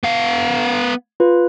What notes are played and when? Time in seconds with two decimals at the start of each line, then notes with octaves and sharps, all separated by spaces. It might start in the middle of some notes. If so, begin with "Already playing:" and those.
0.03 B3 F5
1.20 F4 B4